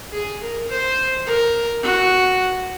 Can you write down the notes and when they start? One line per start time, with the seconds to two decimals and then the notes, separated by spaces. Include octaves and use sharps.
0.12 G#4
0.42 A#4
0.70 C5
1.26 A#4
1.83 F#4